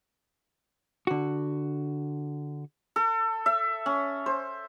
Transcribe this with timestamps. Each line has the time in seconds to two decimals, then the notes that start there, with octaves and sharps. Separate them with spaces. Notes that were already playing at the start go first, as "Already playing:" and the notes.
1.07 D3 F#4
2.96 A4
3.46 E5
3.86 C#4
4.26 C5